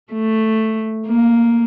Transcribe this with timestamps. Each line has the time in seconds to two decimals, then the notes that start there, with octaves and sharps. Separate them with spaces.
0.13 A3
1.07 A#3